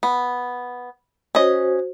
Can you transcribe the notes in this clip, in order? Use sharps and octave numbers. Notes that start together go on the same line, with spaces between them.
B3
C#4 F#4 C5 D#5